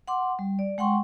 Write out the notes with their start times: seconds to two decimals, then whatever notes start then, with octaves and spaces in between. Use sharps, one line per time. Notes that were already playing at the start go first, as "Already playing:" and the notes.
0.08 F#5 C6 D6
0.39 G3
0.59 D5
0.78 G#3 F#5 G5 C6 C#6